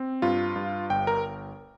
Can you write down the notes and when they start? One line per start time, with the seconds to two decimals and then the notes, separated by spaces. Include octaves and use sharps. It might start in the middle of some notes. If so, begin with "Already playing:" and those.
Already playing: C4
0.22 G2 F4
0.56 G2
0.90 G1 G5
1.07 A#4